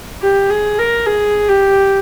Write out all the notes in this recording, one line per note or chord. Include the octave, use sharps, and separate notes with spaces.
G4
G#4
A#4
G#4
G4